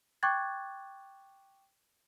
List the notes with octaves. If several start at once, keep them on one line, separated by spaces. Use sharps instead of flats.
G5 C#6 D6 F#6 G#6 A6